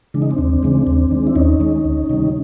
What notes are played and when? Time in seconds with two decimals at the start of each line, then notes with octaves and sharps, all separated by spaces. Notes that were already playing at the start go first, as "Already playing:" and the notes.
0.14 C#3 E3 G#3 D4
0.22 D#4
0.30 C4 D4
0.38 D#2
0.63 C#3 E3 G#3
0.87 D#2
1.11 D#3 G#3
1.27 E4
1.35 D#2 C#4 D#4
1.60 D#3 G#3
1.85 D2
2.10 C3 D#3 G3